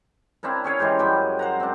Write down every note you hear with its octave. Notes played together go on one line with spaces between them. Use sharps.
C4 D4 E4 A#4
C#4 G#4 C#5 F5
E3 G#3 G4 C5
F#2 G3 G#3 G5
C5 F#5 A#5
C4 D4